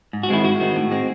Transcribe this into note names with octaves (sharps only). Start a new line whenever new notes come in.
G#2
F#4
D#3 G#3 C4 E4
G#2 F#4
D#3 G#3 C4
A2
G#3 C4